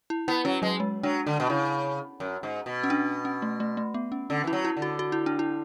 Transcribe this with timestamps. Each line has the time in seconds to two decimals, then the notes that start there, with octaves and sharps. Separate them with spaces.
0.10 E4
0.28 B3 E4
0.45 F#3 C#4
0.62 F#3 G#3
0.80 G#3
1.03 F#3 D4
1.26 D3 D4
1.40 B2
1.50 C#3 E4
2.20 F#2
2.43 G#2
2.66 B2
2.84 C#4
2.90 D4
3.25 C#4
3.42 A3
3.60 A3
3.77 A3
3.94 B3
4.12 C#4
4.30 D3 C#4
4.44 E3
4.47 E4
4.53 F#3
4.65 E4
4.77 D3
4.82 F#4
4.99 F#4
5.12 E4
5.26 D4
5.39 E4